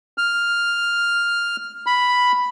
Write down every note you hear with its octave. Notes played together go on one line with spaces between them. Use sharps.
F6
B5